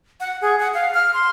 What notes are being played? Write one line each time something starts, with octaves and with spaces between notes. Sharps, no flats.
F#5
G#4
F#5
F5
F6
C6